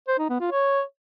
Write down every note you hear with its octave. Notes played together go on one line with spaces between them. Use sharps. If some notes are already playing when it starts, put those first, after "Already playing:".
C5
D#4
B3
F4
C#5